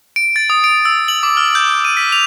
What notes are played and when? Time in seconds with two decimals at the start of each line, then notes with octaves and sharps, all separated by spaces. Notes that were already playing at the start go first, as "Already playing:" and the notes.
0.16 D7
0.36 A6
0.50 D#6
0.64 D7
0.85 E6
1.08 F#7
1.23 D6
1.37 F6
1.55 G6
1.85 D#7
1.97 B6
2.12 F7